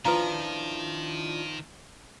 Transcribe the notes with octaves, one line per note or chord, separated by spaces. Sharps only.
D#3 F3 D4 E4 F4 B4 A#5